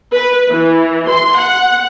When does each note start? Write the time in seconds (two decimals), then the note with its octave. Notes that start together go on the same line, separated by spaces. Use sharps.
0.14 B4
0.50 E3
1.08 C6
1.38 F#5